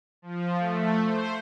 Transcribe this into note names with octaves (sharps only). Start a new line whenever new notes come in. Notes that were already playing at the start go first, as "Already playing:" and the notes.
F3
A3
C5